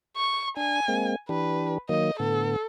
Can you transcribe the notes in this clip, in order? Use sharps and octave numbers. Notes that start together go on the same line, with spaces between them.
C#6
D4 G#5
G#3 A#3 C4
E3 D4 G4 B4
D#3 F#3 A#3 D#5
A2 D3 B3 A4